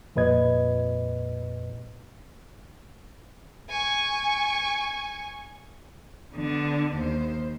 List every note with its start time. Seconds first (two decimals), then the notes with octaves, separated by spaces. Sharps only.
0.16 F2 A#2 B4 D#5 G#6
3.69 G#5 C#6
6.35 D3 B3
6.95 D#2 C5